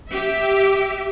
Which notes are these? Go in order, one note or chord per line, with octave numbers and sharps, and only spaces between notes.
G4 E5